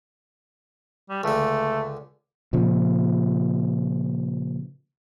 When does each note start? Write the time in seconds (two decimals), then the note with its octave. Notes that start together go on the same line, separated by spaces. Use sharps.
1.10 G3
1.24 C#2 D3 A3
2.53 A#2 C#3 F3